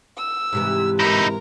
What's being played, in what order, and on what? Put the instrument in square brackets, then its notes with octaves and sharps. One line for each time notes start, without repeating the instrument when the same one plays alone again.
[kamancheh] E6
[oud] G#2 C3 E3
[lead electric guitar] D#4 E4 [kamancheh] A#4 A#5